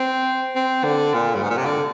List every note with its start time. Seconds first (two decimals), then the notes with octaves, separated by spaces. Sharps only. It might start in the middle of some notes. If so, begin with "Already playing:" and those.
Already playing: C4
0.56 C4
0.84 D3
1.14 A#2
1.35 G2
1.43 G#2
1.50 A#2
1.58 C3
1.65 D3